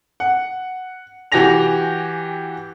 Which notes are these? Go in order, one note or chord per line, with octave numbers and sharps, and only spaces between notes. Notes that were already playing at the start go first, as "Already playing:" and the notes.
F#5
E3 F#4 G4 G#5 A#6 F7